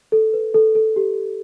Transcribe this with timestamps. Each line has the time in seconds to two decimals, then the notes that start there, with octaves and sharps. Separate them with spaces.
0.12 A4
0.33 B4
0.54 A4
0.75 A4
0.96 G4